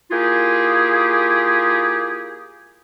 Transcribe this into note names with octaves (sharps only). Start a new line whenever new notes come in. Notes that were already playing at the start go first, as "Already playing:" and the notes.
A#3 E4 F4 G4 G#4